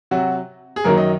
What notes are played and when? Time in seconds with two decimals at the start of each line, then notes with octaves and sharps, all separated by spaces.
0.11 C3 F#3 F#4
0.76 G#4
0.84 F#2 D#3 F#3 A#3 A#4
0.97 D#5